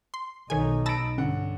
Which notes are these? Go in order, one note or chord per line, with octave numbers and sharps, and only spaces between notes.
C6
B1 D#3 D#4 A4 C#5 G#5
A5 B5 E6 A#6 D7
G2 D3 C#4 F#5